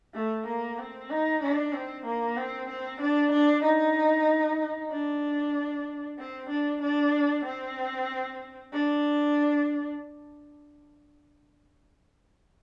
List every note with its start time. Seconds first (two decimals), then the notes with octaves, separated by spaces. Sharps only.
0.14 A3
0.47 A#3
0.78 C4
1.10 D#4
1.42 D4
1.73 C4
2.06 A#3
2.37 C4
2.69 C4
3.01 D4
3.32 D4
3.64 D#4
4.91 D4
6.19 C4
6.49 D4
6.82 D4
7.46 C4
8.73 D4